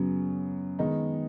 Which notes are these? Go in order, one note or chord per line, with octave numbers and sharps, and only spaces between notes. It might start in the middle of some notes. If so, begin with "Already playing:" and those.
Already playing: F#2 C#3 F#3 B3
D#3 G#3 B3 D#4